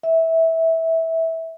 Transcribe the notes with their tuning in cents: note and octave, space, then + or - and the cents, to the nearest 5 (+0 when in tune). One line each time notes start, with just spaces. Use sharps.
E5 -15